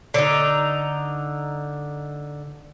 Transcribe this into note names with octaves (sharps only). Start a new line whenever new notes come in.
D3 D#4